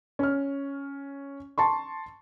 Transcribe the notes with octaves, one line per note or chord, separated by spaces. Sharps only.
C#4 F6
A5 C6 C#6